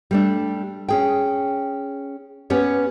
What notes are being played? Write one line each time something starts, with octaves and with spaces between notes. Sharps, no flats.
G3 A3 D4
C#4 G#4 G5
B3 C#4 G4 C#5